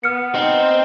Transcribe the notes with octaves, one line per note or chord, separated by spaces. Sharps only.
B3 F6 C#7
C4 D#4